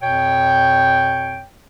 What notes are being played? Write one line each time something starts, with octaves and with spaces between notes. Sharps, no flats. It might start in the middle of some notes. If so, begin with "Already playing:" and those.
F2 B2 C#5 G5